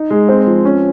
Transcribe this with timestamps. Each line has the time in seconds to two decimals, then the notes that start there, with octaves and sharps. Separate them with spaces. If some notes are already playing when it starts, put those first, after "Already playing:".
Already playing: D#4
0.10 G#3
0.29 C4
0.46 F3
0.65 C#4